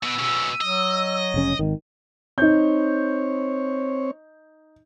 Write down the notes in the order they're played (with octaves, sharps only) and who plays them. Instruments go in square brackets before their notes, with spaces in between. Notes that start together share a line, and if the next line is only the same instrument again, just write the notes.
[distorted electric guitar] B2 [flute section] E6
[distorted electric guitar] B2 C#4
[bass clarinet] F#3 [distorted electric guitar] D#5
[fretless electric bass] F1 C#3 C#4
G#1 D#3
[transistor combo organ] C4 C#5 [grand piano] D#4 G6